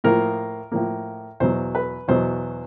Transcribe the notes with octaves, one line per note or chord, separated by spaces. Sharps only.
A2 F3 A#3 A#4
A2 F3 A#3
E2 B2 F#3 C5
B4
E2 B2 F#3 C5